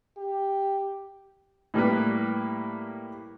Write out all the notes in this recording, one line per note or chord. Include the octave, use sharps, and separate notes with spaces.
G4
A2 G3 A#3 B4